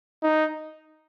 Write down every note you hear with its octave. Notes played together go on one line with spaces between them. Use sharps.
D#4